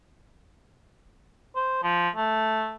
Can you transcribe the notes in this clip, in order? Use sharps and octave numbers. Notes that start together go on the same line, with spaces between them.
C5
F3
A3